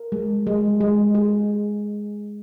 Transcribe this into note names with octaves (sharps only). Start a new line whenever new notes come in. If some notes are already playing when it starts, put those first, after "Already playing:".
Already playing: A#4
G#3
G#3
G#3
G#4